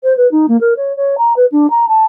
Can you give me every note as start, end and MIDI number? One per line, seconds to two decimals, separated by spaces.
0.04 0.16 72
0.17 0.30 71
0.32 0.46 63
0.49 0.59 58
0.61 0.74 70
0.77 0.95 73
0.97 1.15 73
1.18 1.33 82
1.37 1.46 71
1.52 1.70 62
1.70 1.86 82
1.88 2.05 81